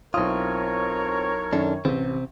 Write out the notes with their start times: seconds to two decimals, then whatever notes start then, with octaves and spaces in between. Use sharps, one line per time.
0.14 B1 C4 E4 F4 A#4 C#5 D#6
1.53 F#2 D#3 D4 A4
1.85 A1 C3 C4